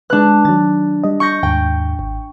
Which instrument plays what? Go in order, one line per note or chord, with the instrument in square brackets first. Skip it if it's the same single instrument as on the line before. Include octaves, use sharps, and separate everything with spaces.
[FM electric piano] G#3 B4 [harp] D4 F#6
[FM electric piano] D#3 F#3 [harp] A6
[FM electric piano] G3 D#5
[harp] C#6 G6 A#6
[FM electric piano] D#2 G#2 [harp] G5
[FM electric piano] G#1